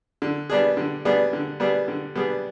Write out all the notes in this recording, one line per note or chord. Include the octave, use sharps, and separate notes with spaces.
D3
G3 B3 D4 G#4
D3
G3 B3 D4 G#4
D3
G3 B3 D4 G#4
D3
G3 B3 D4 G#4